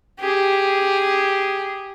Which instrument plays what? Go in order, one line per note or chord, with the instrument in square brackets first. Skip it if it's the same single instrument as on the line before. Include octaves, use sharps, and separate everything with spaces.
[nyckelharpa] G4 G#4